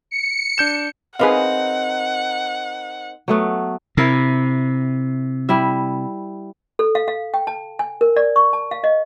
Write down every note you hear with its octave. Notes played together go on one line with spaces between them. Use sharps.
C#7
D4 G6 E7
C4 D#4 G#4 A#4 B4 F5 F#5
F#3 A3 B3
C3 E4 A#4
G3 E4 E5
A4
F5
F5
G5
A5
G#5
A#4
D5
C#6
A5
F5
D#5